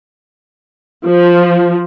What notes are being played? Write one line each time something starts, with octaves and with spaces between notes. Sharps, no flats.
F3